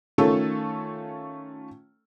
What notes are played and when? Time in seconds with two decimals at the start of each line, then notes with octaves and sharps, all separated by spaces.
0.18 D#3 A3 C#4 F4 A4